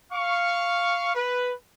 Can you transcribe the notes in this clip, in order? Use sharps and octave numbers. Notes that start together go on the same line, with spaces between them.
F5 C#6
B4